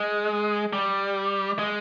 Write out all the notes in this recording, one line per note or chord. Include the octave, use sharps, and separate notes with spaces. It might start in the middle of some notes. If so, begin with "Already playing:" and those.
Already playing: G#3
G3
G#3